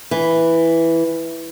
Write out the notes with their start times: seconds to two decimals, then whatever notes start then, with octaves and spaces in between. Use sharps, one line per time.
0.11 E3